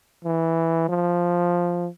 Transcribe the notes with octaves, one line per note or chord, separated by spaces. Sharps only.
E3
F3